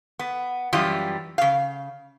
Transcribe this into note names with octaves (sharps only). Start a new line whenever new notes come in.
B3
F#2 E3 G3 F4
C#3 F5